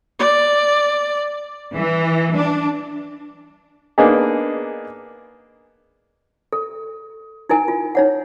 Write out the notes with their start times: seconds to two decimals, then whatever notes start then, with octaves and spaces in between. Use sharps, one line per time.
0.19 D5
1.74 E3
2.34 D4
3.98 A#3 B3 D4 D#4 G#4
6.53 A4
7.49 D#4 E4 A#4 G#5
7.68 F4
7.95 D#4 C#5 F#5